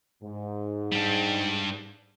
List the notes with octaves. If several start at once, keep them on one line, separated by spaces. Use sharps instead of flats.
G#2
G3 D4